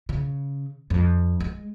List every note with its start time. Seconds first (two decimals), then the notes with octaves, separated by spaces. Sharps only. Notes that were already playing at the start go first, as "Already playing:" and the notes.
0.09 C#3
0.90 F2
1.40 G#3